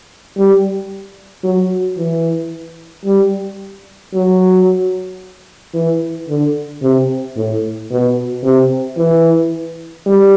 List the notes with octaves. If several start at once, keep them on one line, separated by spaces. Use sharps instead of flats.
G3
F#3
E3
G3
F#3
E3
D3
C3
A2
B2
C3
E3
G3